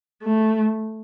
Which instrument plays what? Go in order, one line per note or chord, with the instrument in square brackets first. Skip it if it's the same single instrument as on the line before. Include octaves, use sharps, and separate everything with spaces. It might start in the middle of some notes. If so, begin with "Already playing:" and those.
[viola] A3